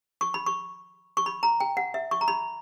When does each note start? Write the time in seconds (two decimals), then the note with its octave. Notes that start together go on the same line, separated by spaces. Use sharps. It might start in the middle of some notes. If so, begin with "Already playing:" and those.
0.21 C#6
0.34 B5
0.46 C#6
1.17 C#6
1.26 B5
1.43 A#5
1.60 G5
1.77 F#5
1.94 E5
2.11 C#6
2.21 A#5
2.28 B5